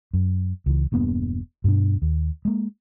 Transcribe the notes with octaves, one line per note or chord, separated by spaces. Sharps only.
F#2
C#2 E3
E1 G2 A#3 B3
G2 B2 D4
D#2
G#3 A#3